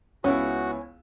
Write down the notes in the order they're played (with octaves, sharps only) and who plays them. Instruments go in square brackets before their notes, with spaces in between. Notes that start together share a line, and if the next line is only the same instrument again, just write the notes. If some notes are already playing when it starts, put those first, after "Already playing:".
[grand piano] C#2 B3 E4 [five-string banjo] C#4 [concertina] F#4